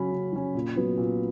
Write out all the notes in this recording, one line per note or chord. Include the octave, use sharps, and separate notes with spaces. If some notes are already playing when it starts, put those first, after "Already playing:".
Already playing: C#3 F#3 C#4 B5
C#3
F#3 C#4
A#2
F#3 B3
A#2